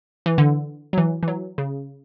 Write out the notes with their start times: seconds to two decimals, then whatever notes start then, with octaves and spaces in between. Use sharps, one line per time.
0.26 E3
0.38 D3
0.93 F#3
0.98 E3
1.23 E3
1.28 F#3
1.58 C#3